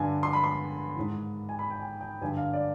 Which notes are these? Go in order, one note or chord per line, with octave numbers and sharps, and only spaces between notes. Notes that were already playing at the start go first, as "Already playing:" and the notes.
Already playing: G2 D3 G#5
C6
B5
C6
G#2 D#3
G#5
B5
G5
G#5
G5
G2 D3 G#5
F5
D5